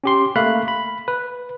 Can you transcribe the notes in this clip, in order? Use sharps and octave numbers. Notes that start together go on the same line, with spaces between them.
C#4 G4 C6
A3 A#3 F5 B5 F#6
B5
B4